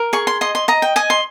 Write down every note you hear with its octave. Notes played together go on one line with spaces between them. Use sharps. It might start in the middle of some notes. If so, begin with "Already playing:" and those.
Already playing: A#4
G#4 C#6
C6
D#5 C6
C6
D#5 A#5
G5
D#5 G#5
C6